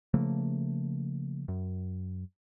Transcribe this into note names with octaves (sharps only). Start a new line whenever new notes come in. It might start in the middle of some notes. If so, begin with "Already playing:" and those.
C#3 F3 A3 A#3
F#2